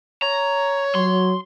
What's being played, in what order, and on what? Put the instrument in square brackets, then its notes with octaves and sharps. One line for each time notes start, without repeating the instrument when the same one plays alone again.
[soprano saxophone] C#5 [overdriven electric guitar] A#5
[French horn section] F#3 [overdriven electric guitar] C6